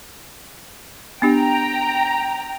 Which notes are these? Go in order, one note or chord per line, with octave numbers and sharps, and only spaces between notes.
B3 D4 G4 G5 A#5